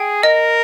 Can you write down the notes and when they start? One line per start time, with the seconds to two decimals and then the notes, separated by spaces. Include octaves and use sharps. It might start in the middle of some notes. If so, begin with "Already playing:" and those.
Already playing: G#4 G5
0.23 A#4 D#5